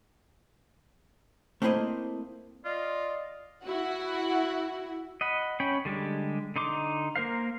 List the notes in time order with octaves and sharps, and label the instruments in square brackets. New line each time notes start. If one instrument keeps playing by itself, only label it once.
[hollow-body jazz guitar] A3 A#3 C4 E4 C5 D#5
[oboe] F4 [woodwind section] D5 D#5
[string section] E4 F#4 F#5
[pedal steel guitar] D#5 F#5 B5
C#4 C#5 G5 B5
D3 G3 G#3 G4
D3 D#4 C6 D6
A#3 A#4 C5 F5